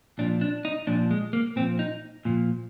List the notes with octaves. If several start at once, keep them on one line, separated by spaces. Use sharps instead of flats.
A#2 F3 D4
D4
D#4
A#2 F3 D4
G#3
A#3
A#2 F3 C4
D#4
A#2 F3